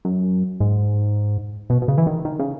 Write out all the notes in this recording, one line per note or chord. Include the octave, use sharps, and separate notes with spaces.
F#2
G#2
B2
B2
C#3
E3
D#3
D#3
C#3